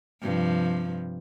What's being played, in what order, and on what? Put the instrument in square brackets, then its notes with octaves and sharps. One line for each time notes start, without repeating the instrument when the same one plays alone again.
[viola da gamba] G2 C3 F3